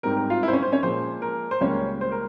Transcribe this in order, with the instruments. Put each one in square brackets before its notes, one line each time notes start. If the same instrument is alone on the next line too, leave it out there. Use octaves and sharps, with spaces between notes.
[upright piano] G#2 G3 C4 A#4
A#4
F4 F5
E4 E5
C5
C#4 C#5
C5
C#4 C#5
A#2 F3 G#3 C5
A#4
C5
C#2 C#3 G3 A#3 C#4 C#5
C5
A#4